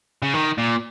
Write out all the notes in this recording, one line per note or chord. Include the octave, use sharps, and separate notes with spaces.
C#3
D#3
A#2